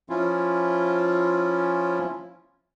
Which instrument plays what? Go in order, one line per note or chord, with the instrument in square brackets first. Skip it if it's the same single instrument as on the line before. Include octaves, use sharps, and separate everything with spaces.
[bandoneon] F3 C#4 E4 F4